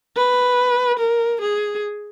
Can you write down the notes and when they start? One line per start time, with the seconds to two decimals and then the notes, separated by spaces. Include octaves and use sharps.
0.16 B4
0.99 A#4
1.41 G#4